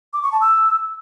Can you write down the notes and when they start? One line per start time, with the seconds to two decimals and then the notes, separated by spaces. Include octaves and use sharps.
0.13 D6
0.23 C#6
0.32 A5
0.41 E6